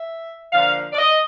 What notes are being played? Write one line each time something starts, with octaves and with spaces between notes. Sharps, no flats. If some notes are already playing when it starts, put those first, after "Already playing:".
Already playing: E5
D3 F3 A#3 F5
D5
D#5